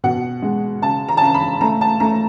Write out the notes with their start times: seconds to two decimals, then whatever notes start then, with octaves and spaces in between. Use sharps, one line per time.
0.04 B2 F#5
0.42 G#3
0.82 C#3 A5
1.09 A#5
1.17 A5
1.21 C#3 A#5
1.34 B5
1.61 A3 A#5
1.81 A5
2.00 A3 A#5